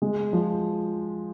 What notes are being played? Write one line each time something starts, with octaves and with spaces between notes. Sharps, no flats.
G#3
F3